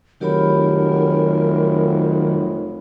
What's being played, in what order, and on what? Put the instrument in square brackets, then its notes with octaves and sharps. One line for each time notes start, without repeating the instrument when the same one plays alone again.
[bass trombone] F1 [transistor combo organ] D#3 F#3 [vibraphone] G4 C#5 B5 [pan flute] A#4